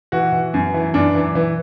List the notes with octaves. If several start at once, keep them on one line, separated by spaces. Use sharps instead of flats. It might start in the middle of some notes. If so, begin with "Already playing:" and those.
E3 F#4
E3
F#2
E3
F#2 D4
E3
E3